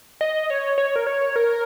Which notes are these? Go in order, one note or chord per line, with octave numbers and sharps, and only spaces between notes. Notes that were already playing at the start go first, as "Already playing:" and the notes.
D#5
C#5
C#5
A#4
C#5
A#4